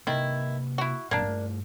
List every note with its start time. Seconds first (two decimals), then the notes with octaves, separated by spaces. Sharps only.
0.07 C3 D#3 A#3 E4
0.78 E4 F#4
1.11 G#1 F#2 A#2 A#3 D4
1.27 G2 A3